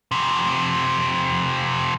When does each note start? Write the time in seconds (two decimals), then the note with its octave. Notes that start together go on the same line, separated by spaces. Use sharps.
0.11 F2 C3